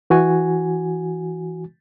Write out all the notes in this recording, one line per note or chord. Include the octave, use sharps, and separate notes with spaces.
E3 F#4 G#5